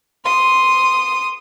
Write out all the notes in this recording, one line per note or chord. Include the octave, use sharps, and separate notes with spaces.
C6 D#6